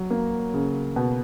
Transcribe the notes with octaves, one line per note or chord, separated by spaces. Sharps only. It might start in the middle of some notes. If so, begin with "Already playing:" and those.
Already playing: F#3
A#3
C#3
B2